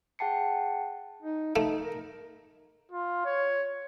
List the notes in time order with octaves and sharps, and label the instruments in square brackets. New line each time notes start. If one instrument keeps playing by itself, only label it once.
[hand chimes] G#4 F#5 G5 A5 C7 C#7
[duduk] D#4
[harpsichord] A3 [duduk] D#4
[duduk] A#4
[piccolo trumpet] F4
C#5